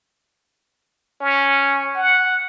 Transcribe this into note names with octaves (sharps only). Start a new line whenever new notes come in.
C#4
F#5